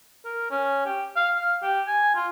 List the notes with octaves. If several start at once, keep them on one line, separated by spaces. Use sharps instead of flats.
A#4
C#4
G4
F5
F5
G4
G#5
F4